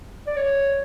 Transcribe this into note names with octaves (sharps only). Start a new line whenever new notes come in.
D5
C#5